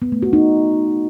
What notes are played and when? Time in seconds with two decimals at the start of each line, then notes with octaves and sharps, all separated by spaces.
0.02 B3
0.12 A3
0.22 F#4
0.33 D#4